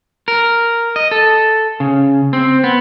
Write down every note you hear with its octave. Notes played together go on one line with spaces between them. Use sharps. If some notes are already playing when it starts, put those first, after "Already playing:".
A#4
D#5
A4
C#3
C4
B3